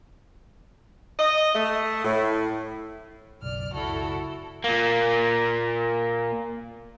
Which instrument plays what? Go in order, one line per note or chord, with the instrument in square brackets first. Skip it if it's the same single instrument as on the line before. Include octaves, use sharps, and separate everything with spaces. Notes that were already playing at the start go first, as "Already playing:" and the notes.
[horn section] D#5
A3
A2
[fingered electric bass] F#1 B1 [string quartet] D5 F6
[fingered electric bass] F#1 C#2 [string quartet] E4 F#4 A4
[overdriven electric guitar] A#2 A#3